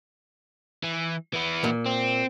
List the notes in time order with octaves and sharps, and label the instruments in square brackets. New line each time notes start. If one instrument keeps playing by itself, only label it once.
[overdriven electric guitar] E3
E3 B3
[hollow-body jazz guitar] A#2
[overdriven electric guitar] C4